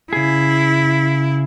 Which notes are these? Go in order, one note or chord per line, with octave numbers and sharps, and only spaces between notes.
C#3 E4 G#4